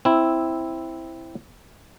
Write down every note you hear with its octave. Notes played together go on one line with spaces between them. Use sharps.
C4 E4